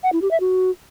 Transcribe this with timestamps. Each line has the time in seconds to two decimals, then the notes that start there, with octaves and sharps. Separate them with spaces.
0.03 F#5
0.12 E4
0.22 G4
0.31 E5
0.40 F#4